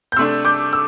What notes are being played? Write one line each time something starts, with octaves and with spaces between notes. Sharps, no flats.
G6
C3 A3 D4 C6 E6
D6 G6
E6